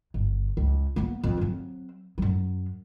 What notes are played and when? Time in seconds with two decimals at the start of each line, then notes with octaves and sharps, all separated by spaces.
0.14 G1
0.57 C#2
0.96 A#3 B3
1.24 F2
1.37 F#3 C4
2.18 F#2 F#3